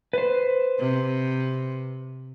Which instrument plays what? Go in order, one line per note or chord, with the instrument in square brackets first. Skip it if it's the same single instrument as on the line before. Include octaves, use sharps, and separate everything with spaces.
[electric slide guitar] B4 C5
[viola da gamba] C3